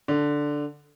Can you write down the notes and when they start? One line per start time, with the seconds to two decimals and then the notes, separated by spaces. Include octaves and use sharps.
0.08 D3